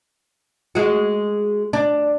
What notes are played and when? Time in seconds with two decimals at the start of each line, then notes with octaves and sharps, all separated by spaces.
0.75 G#3 F#4
1.73 D4